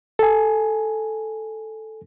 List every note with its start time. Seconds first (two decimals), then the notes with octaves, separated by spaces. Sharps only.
0.19 A4 G#5